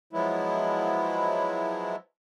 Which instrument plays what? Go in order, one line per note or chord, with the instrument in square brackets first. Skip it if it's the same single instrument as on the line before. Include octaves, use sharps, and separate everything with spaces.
[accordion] F3 F#3 G#3 B3 E4